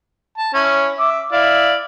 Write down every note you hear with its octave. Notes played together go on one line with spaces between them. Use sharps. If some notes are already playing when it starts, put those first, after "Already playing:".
A5
C#4 E4
E5 D6
E4 D5 F5